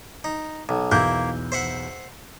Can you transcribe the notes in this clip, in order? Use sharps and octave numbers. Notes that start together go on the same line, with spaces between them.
D#4
B1
B1 E2 A#3 E4 G6
C5 E5 F#5